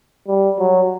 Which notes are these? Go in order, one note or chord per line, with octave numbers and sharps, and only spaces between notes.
G3
F#3